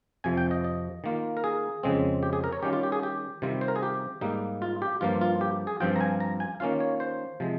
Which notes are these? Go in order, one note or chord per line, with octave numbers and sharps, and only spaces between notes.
F2 C3 F3 G#5
G5
D#5
D#5
D#3 A#3 F4
A#4
G#4
F2 C#3 G#3 C4
G4
G#4
A#4
C#5
D#3 G3 C#4 F4 G4
F4
G4
G#4
G4
C3 D#3 G3 C4 F4
C5
A#4
G#4
G4
G#2 G3 A#3 D#4
F4
G4
G2 F3 A#3 F4
F4
G4
G#4
G2 F3 C4 F4 G5
A#5
G#5
A#5
G#5
D#3 A#3 C#4 F4 F5
C#5
C5
C3 F3 G#3